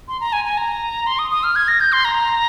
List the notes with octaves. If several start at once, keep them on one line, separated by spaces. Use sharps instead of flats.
C6
A#5
G#5
G#5
A#5
C6
D#6
D#6
F6
G#6
A#6
G6
C6
A#5